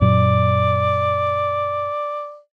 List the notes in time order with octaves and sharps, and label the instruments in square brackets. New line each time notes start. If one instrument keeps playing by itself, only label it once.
[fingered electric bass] F#2 A#2 F#3 [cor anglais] D5